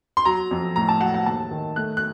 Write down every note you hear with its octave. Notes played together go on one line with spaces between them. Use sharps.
C6
F#3 A#5
F2
A2 A#5
A5
F#3 F#5
F#5
D#2 A5
D#3
A3 F#6
F#6